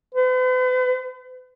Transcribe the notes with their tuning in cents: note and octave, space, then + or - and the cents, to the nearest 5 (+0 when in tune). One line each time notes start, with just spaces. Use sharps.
B4 +45